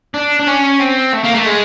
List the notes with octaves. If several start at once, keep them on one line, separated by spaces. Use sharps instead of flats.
D4
D4
C#4
C4
A3
A#3
A3
G#3